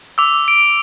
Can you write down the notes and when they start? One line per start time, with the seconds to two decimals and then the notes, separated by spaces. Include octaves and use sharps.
0.18 D6 E6
0.48 D7